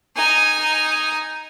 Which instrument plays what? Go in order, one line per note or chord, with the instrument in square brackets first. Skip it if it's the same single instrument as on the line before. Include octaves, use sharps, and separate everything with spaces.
[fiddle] D#4 G#5